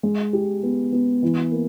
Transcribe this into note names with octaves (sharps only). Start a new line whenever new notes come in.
G#3
G4
B3
B3
E3
A#3